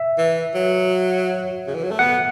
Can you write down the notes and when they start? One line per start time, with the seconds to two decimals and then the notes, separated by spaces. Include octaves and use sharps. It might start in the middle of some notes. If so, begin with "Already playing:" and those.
Already playing: E5
0.18 E3
0.54 F#3
1.67 C#3
1.75 E3
1.83 F#3
1.91 A3
1.99 B3 F#5